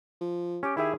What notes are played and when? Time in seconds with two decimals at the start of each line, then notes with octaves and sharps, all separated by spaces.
0.21 F3
0.63 C#4 G4
0.77 D#3 E4 G4 G#4 E5